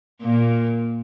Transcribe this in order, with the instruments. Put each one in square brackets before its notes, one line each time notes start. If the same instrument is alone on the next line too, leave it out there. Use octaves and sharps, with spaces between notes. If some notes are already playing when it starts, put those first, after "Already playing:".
[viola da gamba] A#2 A#3